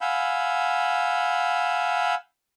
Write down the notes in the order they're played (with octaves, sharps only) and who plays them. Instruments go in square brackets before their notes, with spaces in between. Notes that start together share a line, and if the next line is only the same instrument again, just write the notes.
[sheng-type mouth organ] F5 F#5 G#5 B5 E6 G6